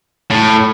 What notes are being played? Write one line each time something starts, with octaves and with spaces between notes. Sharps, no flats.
A2